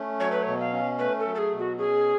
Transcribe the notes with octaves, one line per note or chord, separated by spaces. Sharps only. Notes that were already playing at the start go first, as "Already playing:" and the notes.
Already playing: A3 C#4
F#3 C#5
B4
B2 C#5
F5
C#4
A3 B4
A4
F#3
A4
G#4
B2
F#4
C#4 G#4